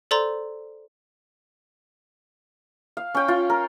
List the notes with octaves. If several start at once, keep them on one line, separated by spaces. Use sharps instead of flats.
A4 C5 D5 A#5 C6
F5
C#4 G5
F4
A#4